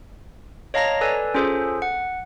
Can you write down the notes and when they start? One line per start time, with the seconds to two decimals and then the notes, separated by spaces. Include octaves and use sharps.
0.74 C#5 D#5 F5 A5 A#5 A#6
1.01 A4 B4 D5 G#5
1.34 C#4 F4 G#4 A4 C5
1.82 F#5